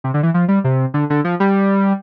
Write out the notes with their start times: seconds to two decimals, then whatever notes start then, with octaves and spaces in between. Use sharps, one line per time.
0.04 C3
0.14 D3
0.23 E3
0.34 F3
0.48 G3
0.64 C3
0.94 D3
1.10 D3
1.25 F3
1.40 G3